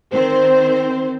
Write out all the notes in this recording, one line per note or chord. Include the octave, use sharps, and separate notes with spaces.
D#3 C4 C5